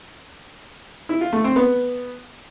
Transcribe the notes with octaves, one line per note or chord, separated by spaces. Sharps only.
E4
F4
A3
C4
B3